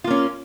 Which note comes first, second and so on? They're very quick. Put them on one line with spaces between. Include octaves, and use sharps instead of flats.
F4 A#3 C#4